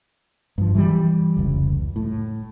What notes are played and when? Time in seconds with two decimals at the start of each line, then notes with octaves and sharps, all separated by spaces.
0.58 G2 F3
0.75 E3 F3 G3
1.37 F1 C#2
1.96 A2